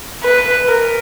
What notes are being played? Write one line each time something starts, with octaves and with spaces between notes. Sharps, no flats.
B4
A#4